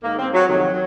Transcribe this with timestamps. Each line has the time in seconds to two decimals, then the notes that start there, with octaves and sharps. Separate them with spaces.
0.03 G#2 D#3 A#3
0.18 C4
0.34 F#3
0.49 F2 C3 D#3 F#3